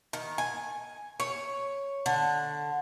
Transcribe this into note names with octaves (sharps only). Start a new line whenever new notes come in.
D#3
G#5
C#5
D3